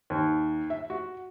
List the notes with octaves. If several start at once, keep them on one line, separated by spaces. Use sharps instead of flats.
D#2
E5
F#4